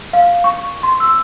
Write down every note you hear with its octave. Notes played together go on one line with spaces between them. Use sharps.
F5
C#6
C6
E6